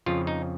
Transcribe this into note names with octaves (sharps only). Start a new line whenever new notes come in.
F2 C#3 F3 F4
D#4